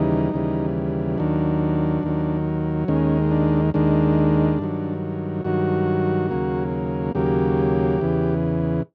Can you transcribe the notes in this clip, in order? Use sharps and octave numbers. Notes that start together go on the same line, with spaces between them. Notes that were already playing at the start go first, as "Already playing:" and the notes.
Already playing: D#2 C#3 E3 G3 D#4
D#2 C#3 E3 G3
D#2 D#3 F#3 D4
D#2 D#3 F#3
D#2 D#3 G#3 C#4
D4
D#2 D#3 G#3 D4
G2 D#3 F#3
G2 D#3 F#3 F#4
D#2 C#3 F#3 A#3
D#2 C#3 F#3 A#3 G4
E2 C#3 E3